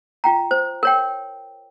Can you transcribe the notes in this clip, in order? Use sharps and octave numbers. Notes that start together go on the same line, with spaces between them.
F4 G5 A#5
C5
A#4 C#5 G5